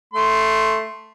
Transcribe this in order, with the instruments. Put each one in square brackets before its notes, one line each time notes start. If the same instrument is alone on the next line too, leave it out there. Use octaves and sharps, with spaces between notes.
[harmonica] A3 C6